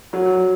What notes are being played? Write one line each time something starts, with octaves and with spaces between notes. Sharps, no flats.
F#3